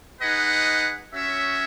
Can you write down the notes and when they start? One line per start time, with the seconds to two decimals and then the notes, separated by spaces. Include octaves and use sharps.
0.20 D#4 G#4 B4 D#5 F#5
1.12 C#4 F#4 C#5 E5